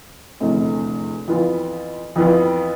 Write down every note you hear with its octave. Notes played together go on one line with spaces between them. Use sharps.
F1 E2 D3 A3 C4
F2 E3 B3 F4
F2 E3 B3 F4